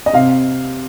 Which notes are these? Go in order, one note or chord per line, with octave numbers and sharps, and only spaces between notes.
D#5
C3 F5